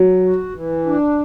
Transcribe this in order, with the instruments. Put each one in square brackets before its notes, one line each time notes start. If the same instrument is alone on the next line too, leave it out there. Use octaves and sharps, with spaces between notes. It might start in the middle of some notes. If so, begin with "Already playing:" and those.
Already playing: [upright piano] F#3
[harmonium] F#4
E3
D4